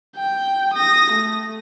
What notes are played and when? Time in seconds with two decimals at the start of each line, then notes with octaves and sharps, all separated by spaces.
0.16 G5
0.74 D#6 A#6
1.12 A3